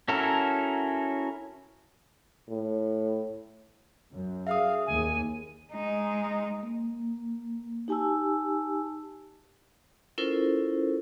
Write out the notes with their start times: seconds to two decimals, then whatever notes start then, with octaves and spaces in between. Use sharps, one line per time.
0.08 C#4 E4 F#4 A4 A#4
2.49 A2
4.12 F#2
4.47 G#4 E5 F5 D#6
4.87 D#2 G#5
5.73 G#3 D#4
6.63 A#3
7.88 D#4 G4 G#5 A5 E6
10.18 C#4 E4 F4 A4 A#4 C5